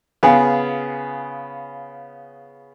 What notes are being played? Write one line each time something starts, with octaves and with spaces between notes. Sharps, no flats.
C#3 B3 F4 G#4